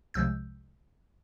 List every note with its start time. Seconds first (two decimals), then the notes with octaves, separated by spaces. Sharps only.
0.14 C2 C3 F3 G#3 E6 G6